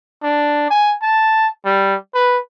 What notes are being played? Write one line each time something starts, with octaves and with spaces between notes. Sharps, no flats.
D4
G#5
A5
G3
B4